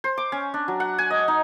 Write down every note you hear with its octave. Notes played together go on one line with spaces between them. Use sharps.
C5
D6
C#4
D4
F#3
F#5
G#5
D#5
D#4